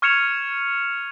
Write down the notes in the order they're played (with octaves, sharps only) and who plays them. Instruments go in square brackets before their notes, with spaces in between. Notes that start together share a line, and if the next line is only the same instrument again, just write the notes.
[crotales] C#6 F6 G#6 C#7 E7 F7